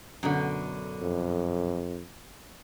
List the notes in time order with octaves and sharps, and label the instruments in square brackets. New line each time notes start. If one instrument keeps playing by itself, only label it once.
[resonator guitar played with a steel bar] F#2 B2 D3
[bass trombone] F2